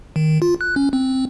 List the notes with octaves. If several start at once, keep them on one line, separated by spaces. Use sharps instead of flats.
D#3
F4
F#6
C#4
C4